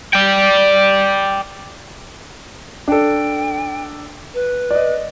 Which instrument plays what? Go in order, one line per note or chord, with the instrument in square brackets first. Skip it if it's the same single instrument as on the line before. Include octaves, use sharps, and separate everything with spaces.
[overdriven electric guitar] D5 G5
[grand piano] D4 A4 [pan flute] G5
[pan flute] B4
[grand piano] D5 D#5